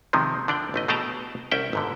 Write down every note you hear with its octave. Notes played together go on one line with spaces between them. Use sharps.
C3 D#3 F3 G#3
D3 D4 D5 G5
A1 A3 D#5
B2 A3 G#4 G5 A5 A#5
C2 C#4 E5 G5
G1 G#2 D3